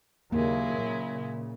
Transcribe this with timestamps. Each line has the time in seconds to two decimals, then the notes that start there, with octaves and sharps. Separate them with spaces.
0.32 D#2 C#3 F#3 G#3 A#3 E4
0.76 A#2 C#3